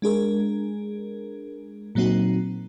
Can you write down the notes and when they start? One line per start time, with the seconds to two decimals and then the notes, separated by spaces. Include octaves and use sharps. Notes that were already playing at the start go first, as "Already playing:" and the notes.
0.02 G#3 D4 G#4 A#4
1.95 A#2 F#3 A#3 C4 D#4 F#4